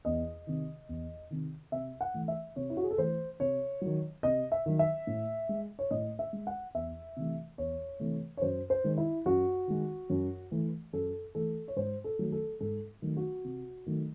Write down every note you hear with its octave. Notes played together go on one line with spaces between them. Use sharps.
E2 D#5
C3 D#3
E2
C3 D#3
C3 E5
F#5
E3 A3
E5
C3 C#5
E4
F#4
G#4
A4
E3 A3 C5
C3 C#5
D#3 F#3
C3 D#5
E5
D#3 F#3
E5
A2
G#3
C#5
A2 D#5
E5
G#3
F#5
E2 E5
C3 E3 A3
E2 C#5
C3 E3 A3
C#5
F#2 C5
C5
D#3 G#3
E4
F#2 F#4
D#3 G#3
F#2
E3 A3
F#2 A4
E3 A3 A4
C#5
G#2 C5
A4
D#3 F#3 A3
A4
G#2 A4
D#3 F#3 A3
F#4
C3
D#3 F#3 A3